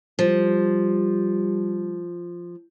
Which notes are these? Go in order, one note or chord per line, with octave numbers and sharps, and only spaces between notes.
F3 G3